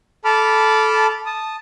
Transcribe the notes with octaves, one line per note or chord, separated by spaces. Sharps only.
A4 A5 B5 D6 F6
A5 D#6